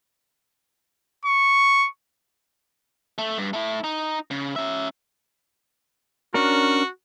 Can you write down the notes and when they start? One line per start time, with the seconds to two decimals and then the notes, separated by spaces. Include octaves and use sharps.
1.25 C#6
3.18 A3
3.38 G2
3.53 A3 E4
3.84 D#4
4.31 C#3
4.56 C#4 E5
6.34 C#4 D4 F#4 A#4